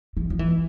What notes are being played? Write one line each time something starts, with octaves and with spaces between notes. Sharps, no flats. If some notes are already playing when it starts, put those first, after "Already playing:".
E3
F3
E3